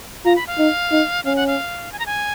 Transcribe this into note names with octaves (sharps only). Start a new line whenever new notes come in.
F4 A#5
B5
F5
D#4
D#4
C#4 F5
F#5
F5
G#5
A#5
G#5